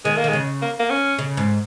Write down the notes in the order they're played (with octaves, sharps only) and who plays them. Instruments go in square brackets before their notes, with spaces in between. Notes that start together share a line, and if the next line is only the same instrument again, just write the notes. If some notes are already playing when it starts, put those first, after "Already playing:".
[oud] D#3 [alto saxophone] G#3
[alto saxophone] A#3
[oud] D#3
[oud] C#3 [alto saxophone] G#3
[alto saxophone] A#3
A#3
C#4
[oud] C#3
G#2